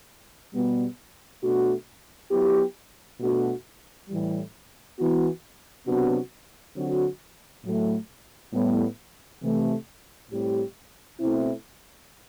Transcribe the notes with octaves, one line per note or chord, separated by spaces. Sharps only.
B2 G3 B3
B2 A3 D4 F#4
F#3 B3 E4 G4
B2 A3 D4 F#4
A2 E3 G3
E3 B3 F#4
C3 F#3 B3 D4 F#4
D3 F#3 C4 F#4
A2 F#3 A3
A2 G3 B3
C3 E3 A3
A2 G3 C4 G4
B2 A3 C4 E4